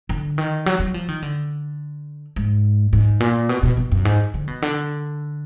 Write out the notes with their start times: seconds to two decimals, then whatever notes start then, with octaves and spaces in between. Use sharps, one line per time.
0.09 D3
0.38 D#3
0.66 F#3
0.80 F#3
0.94 F3
1.08 D#3
1.22 D3
2.36 G#2
2.93 G#2
3.20 A#2
3.49 B2
3.63 B2
3.77 B2
3.92 F#2
4.05 G#2
4.34 D3
4.48 B2
4.62 D3